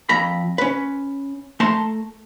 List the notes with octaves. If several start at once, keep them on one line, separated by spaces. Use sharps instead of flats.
F2 A#5 B5
C#4 B4
A3 A5 A#5 C6